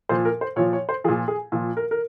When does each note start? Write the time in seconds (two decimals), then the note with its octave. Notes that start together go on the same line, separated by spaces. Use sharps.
0.09 A#2 F3 C5
0.25 A#4
0.41 C5
0.56 A#2 F3 C#5
0.73 C#5
0.89 C5
1.04 F3 G#4
1.08 A#2
1.28 G#4
1.52 A#2 F3
1.77 A#4
1.91 A#4